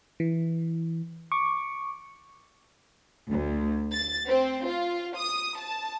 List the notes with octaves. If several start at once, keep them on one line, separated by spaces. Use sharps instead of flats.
E3
C#6 D6
D2
A6
C4
F4
D#6
A5